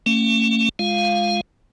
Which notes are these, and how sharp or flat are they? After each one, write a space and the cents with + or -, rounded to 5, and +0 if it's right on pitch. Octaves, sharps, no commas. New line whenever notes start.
A3 +40 C#4 +0
G#3 +0 F4 +0 F5 +0